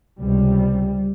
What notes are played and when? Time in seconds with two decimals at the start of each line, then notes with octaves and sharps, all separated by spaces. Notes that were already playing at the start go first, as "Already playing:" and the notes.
0.20 C#2 C3 G3